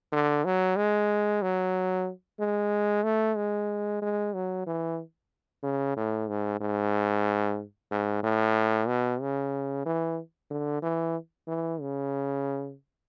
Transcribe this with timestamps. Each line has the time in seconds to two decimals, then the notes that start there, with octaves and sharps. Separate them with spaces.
0.12 D3
0.45 F#3
0.76 G#3
1.42 F#3
2.40 G#3
3.03 A3
3.36 G#3
4.02 G#3
4.33 F#3
4.67 E3
5.63 C#3
5.97 A2
6.29 G#2
6.60 G#2
7.91 G#2
8.23 A2
8.88 B2
9.21 C#3
9.85 E3
10.51 D3
10.83 E3
11.47 E3
11.81 C#3